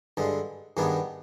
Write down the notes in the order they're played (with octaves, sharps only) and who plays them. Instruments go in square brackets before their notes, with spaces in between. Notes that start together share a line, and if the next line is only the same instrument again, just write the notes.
[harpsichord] G2 D3 G#3
G2 D#3 B3 D4 G#4